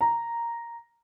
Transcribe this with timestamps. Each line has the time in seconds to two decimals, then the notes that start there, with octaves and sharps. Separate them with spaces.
0.01 A#5